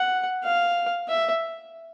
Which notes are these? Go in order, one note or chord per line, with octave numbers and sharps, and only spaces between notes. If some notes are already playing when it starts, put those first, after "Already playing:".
Already playing: F#5
F5
E5